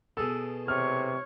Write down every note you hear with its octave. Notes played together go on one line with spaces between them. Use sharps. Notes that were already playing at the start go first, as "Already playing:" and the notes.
B2 G#4 A4 E6
C3 C#5 F6